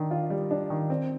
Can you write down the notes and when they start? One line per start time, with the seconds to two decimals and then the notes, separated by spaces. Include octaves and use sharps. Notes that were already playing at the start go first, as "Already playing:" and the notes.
Already playing: D#3 D4
0.11 F4
0.30 G3
0.51 D4
0.70 D#3
0.90 C4